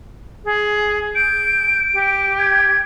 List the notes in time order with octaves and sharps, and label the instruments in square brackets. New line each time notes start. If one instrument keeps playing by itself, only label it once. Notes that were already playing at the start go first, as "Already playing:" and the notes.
[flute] G#4
[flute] G6 [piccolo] D7
[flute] G4
[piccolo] G#6